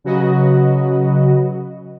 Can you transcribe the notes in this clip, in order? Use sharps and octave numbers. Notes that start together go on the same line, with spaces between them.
C#3 F#3 F#4 B4 D#5